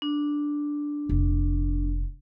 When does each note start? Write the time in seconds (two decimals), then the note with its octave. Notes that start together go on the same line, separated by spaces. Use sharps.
0.02 D4
1.09 F1 A#2